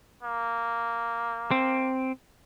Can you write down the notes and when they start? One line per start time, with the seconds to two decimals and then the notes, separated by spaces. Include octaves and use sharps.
0.23 A#3
1.51 C4